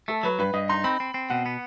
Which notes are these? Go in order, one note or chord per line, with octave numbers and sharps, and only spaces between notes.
A3 A4
F#3 B4
G2 B4
G2 D#5
D#4 C6
C4 B5
C4
C4
B2 F#5
B3